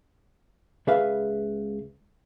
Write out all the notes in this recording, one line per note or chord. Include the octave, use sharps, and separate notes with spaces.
C#2 G#4 B4 E5 F5